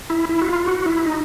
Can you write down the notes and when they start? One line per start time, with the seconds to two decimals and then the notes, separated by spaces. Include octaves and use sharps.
0.10 E4
0.29 E4
0.42 F#4
0.48 F4
0.66 F#4
0.86 E4
1.05 D#4